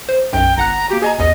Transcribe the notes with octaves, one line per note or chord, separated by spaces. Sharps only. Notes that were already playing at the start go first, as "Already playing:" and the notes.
C5
B1 F#2 G5
G1 F#5 A#5 F#6
A#3 F#4 G4
G#4 D#5 G#5 A#5
A1 E2 D#5